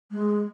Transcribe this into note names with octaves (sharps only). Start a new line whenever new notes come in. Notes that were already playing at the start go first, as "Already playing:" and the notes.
G#3